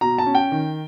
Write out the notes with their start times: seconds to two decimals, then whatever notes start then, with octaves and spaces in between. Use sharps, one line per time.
0.01 B2 A#5
0.18 A5
0.26 C#4
0.35 G5
0.52 D#3